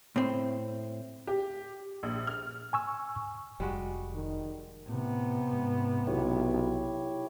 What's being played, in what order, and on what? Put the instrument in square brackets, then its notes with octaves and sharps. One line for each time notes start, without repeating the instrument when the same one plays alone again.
[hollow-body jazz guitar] A2 C4
[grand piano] G4
[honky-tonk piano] A#1
F6
[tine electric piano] G#5 C#6 E6
[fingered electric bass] F1 [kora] G3 G#3 F#4
[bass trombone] D#3
[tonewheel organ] A2 [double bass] C3 B3
[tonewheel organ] G#2
[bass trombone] B1 [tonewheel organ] E4 G4 C#5